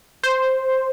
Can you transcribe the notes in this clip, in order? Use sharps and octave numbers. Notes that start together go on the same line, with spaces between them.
C5